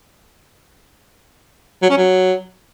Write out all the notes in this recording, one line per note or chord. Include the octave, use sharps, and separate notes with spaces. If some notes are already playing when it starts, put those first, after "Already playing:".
F#3
C#4
F#3